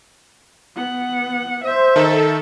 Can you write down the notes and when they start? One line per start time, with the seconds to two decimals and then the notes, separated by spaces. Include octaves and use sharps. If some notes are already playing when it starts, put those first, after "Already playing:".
0.75 B3 F#5
1.64 C5 E5
1.96 D#3 D#4 A4 E7